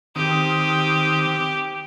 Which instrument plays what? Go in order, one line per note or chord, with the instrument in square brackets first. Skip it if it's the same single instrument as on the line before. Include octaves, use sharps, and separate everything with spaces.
[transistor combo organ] D#3 C4 D#6 [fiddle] G4